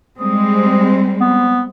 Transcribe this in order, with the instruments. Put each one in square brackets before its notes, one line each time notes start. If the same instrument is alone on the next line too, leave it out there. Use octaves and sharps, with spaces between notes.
[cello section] G3 G#3 C4 [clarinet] D#6
[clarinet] B3